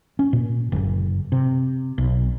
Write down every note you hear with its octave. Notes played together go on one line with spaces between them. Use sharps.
C#4
A#2
F#1
C3
B1